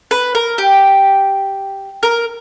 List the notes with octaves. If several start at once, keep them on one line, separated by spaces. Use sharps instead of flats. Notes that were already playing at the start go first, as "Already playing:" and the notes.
B4
A#4
G4
A#4